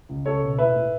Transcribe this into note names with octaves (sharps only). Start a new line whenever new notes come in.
C#2
C#2 A4 C#5
B2
A2 B4 E5
A2